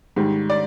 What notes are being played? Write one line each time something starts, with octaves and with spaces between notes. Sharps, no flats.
G#2 D#3 G3
D5